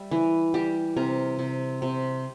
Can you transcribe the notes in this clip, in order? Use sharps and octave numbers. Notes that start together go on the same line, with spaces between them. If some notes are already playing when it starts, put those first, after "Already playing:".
Already playing: G3 E5
E3
G3 G4
C3 A#4
C3
C3